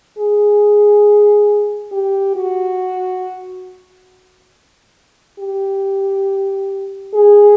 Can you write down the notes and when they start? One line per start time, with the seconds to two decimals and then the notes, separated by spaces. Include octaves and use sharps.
0.18 G#4
1.92 G4
2.36 F#4
5.39 G4
7.14 G#4